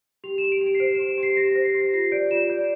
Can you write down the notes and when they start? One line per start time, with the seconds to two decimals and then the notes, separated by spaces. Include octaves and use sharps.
0.24 G4 F7
0.38 E7
0.42 G4
0.52 D7
0.61 G4
0.67 D7
0.75 C7
0.80 C5 D7
0.95 E7
0.99 G4
1.08 E7
1.18 G4
1.23 C7
1.36 G4 A#6
1.51 C7
1.55 C5
1.65 C7
1.75 G4
1.80 A#6
1.93 F4 C7
2.12 D5 D7
2.31 F4 E7
2.50 D5